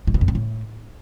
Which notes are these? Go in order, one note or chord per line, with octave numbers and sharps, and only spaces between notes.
A2
B2
F2
B2
A2